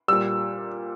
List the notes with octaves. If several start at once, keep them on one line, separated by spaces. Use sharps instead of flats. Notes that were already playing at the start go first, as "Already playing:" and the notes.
A#2 G3 E6